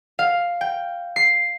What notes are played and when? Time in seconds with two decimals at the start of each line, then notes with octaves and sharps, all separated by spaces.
0.19 F5
0.61 G5
1.16 C7